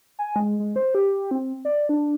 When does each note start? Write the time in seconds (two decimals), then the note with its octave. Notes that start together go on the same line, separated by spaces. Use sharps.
0.19 G#5
0.36 G#3
0.59 G#3
0.76 C5
0.95 G4
1.31 C4
1.65 D5
1.89 D4